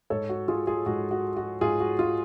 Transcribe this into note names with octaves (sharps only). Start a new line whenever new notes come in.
G#2 A4 C#5
F#4
F4 G#4
F4 G#4
G#2 F#4
F#4
F#4
G#2 F4 G#4
F#4
F4